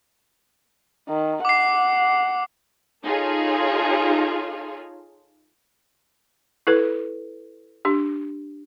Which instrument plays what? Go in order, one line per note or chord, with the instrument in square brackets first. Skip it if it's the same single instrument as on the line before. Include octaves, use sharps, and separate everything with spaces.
[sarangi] D#3
[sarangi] F#5 [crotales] D6 C7
[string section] D#4 F4 G#4 A4 C#5
[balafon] E4 A4 B4
D4 G4